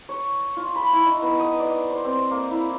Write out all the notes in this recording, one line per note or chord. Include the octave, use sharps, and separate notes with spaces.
C#5
F4
B5
E4
D#4
B3
D#6
D5
C5
C4
A#3
E4